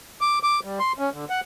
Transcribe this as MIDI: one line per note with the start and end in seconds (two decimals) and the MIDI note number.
0.21 0.39 86
0.43 0.60 86
0.64 0.79 55
0.79 0.92 84
0.99 1.10 61
1.13 1.25 50
1.30 1.41 78